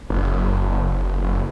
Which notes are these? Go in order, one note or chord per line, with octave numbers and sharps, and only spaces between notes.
F#1